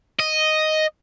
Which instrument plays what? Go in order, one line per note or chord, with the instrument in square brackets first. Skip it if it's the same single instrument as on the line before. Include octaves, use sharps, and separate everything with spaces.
[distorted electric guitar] D#5